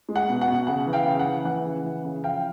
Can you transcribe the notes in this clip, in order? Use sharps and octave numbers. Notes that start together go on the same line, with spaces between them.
G#3
F#5
B2
F#5
B2
C#3 F#5
E3
F5 G5
C#3
F#5
E3
E3 F#5
C#3
E3
C#3
F3 F5 G5